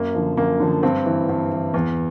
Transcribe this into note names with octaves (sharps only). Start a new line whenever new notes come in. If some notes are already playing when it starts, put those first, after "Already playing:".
Already playing: F#2 A#3
D3 F3
F#2 A#3
D3 F3
G2 C4
E3
G2
E3
E2